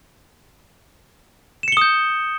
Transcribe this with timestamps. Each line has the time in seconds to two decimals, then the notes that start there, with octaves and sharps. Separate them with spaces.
1.63 E7
1.68 C#7
1.72 G7
1.77 D#6
1.81 G6